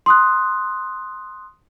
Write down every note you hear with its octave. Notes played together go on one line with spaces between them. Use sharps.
C6 D#6 F#6